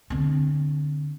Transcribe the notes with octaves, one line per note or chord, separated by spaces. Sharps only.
D3 C4